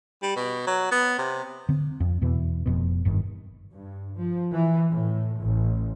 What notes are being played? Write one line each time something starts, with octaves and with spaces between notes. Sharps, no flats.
G3
B2
F#3
B3
C3
D3 C4
F2
E2 B2 E3
F1 F2 B2
G1 G2 D3 D#3
G2
F3
E3
A2
A1